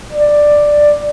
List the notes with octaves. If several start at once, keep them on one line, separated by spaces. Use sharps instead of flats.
D5